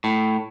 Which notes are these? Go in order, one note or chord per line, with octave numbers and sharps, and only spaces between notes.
A2